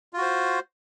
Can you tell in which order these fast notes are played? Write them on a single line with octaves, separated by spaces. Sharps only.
F4 F#4 C5